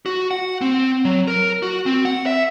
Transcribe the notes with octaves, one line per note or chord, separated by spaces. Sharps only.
F#4
F#5
C4
F#3
A#4
F#4
C4
F#5
E5